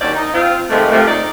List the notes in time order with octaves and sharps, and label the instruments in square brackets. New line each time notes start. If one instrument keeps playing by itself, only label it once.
[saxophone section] D#2 D#3 C#4 F#4 C5 D5
D#4
C4 F4
C3 D#3 F3 G#3 A3
C3 F3 A3
D#4 D5